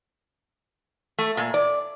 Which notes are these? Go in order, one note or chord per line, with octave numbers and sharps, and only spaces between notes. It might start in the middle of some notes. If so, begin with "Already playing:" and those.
A3
A#2
D5